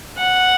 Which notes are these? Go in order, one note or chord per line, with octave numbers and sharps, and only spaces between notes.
F#5